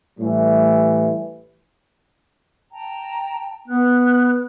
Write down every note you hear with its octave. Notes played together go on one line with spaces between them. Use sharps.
A2 E3 G3
G5 A5 A#5
B3 B4 F#6